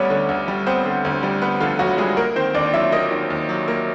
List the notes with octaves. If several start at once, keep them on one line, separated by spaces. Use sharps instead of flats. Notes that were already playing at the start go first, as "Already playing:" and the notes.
Already playing: D2 D3 G3 B3 C#4 C#5 D5
D3
D2
G3
B3 C4 C5
D3
D2
G3
B3 B4
D3 F3 F4
D2 F#3 F#4
G3 G#3 G#4
A#3 A#4
D#3 C4 C5
D#2 D4 D5
F#3 E4 E5
A#3 D#4 D#5
D#3
D#2
F#3
A#3